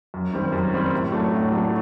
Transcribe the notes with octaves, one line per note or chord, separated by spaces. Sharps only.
F#2
D#3 G3 C4
F#2
D#3 G3 C4
A2
F#3 A3 D4
A2
F#3 A3 D4